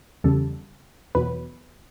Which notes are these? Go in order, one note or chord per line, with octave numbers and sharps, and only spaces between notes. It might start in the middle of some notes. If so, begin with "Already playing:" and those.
E2 C#3 G3 A4
E2 B2 F#3 B4